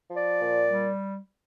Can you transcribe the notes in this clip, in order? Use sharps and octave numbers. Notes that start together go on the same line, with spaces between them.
F3
D5
A#2
G3